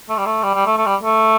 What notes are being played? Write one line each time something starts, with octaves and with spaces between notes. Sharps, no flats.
A3
G3
A3
G3
G3
A3
A3
G3
A3